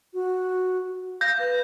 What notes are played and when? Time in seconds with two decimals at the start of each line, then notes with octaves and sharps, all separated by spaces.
0.14 F#4
1.21 F5 G6 A#6
1.39 B4